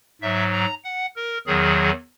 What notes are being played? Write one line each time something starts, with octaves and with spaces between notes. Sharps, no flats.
G#2 F#3 E5
A#5
F#5
A#4
E2 D#3 F#3 G#4